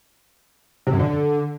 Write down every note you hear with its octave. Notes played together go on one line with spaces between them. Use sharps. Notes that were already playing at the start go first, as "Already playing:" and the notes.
C3
F#2
D3